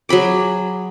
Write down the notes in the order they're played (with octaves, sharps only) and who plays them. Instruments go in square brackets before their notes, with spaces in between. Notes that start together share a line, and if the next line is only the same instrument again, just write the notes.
[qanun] F#3 G#4 B5 D6